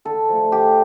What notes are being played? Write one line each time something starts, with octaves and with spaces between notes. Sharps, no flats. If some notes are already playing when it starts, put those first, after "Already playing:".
D3 A4
F3 A3
D3 G4